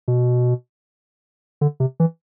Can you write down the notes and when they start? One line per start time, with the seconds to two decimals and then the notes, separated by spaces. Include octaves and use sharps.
0.08 B2
1.61 D3
1.80 C3
2.00 E3